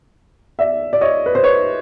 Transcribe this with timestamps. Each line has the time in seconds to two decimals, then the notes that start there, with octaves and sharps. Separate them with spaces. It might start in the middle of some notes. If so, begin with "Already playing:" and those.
0.59 D5 E5
0.93 D5
1.01 C#5 D#5
1.26 B4
1.35 C5
1.43 B4 C#5